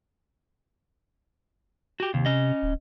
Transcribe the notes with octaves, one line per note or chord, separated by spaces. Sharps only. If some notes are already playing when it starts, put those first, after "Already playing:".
F#4 G4
D#2 C3
C#4 D#5
D1